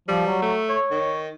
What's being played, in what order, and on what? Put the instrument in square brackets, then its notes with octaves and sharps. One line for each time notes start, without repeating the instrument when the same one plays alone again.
[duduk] F3 [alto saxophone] G3
[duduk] F#3
[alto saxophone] A3
[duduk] C#5
[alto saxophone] D#3